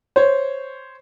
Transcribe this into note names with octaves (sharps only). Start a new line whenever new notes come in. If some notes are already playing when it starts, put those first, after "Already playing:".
C5 C#5